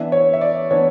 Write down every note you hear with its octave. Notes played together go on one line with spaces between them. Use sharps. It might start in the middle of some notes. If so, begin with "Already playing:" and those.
Already playing: E3 B3 D4 E5
C#5
E5
D5
E3 B3 D4 C#5